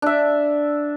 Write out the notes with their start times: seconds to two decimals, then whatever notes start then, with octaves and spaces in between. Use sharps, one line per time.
0.02 D4 E5